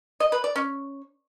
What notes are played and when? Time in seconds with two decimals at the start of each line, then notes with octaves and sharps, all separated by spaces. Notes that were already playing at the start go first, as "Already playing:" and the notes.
0.20 D#5
0.32 B4
0.44 D5
0.56 C#4